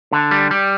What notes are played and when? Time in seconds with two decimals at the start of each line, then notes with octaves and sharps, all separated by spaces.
0.12 D3
0.31 G3
0.51 G3